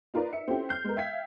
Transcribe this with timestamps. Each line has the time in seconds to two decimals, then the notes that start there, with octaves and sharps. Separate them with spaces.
0.14 D#4 F4 A#4 B4 D5
0.33 E5 C#7
0.48 C4 C#4 E4 F4 G4 A4
0.69 F6 G6 C7
0.84 G#3 B3 A#4
0.96 E5 F5 G5 G#6 B6